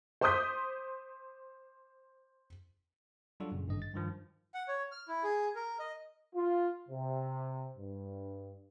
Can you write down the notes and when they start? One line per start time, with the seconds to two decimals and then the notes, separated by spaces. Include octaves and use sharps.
0.21 C5 C6 D6 D#6 G6 B6
3.40 F#3 G3 D4 F4 F#4 A4
3.52 F#2 A#2 C#3
3.67 G#1 G2 D3 D#5
3.82 A6
3.94 G2 D#3 F3
4.54 F#5
4.68 C#5
4.92 F6
5.08 E4
5.24 G#4
5.56 A#4
5.79 D#5
6.35 F4
6.89 C3
7.77 G2